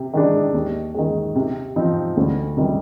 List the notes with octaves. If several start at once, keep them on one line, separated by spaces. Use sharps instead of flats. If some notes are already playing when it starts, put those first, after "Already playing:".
Already playing: C3
D#3 G#3 D4
D#2
D#3 G#3
C3
F3 C4 D#4
D2
C3 D#3 G3